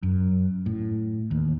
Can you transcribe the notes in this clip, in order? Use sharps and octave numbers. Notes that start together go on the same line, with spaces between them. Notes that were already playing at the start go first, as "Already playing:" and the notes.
F#2
A2
D#2